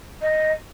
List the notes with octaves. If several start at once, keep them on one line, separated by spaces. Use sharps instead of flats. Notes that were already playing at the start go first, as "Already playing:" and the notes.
D#5